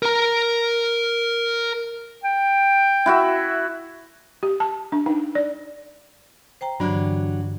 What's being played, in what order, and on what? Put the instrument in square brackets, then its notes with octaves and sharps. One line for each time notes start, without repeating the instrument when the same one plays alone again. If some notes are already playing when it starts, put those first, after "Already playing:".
[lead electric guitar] A#4 A#5
[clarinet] G5
[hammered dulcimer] E4 F#4 E5
[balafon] G4
A5
D4
D#4
D5
[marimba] C5 G5 A#5
[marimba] G2 D3 E3 [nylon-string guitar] F#3 D4